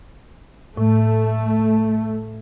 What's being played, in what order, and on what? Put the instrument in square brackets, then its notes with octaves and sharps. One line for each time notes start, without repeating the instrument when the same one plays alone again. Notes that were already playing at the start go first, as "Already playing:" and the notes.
[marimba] A2 [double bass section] A3